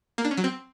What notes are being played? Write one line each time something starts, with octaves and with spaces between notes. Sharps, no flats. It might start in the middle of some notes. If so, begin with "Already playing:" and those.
A#3
D4
C#4
F#3
C4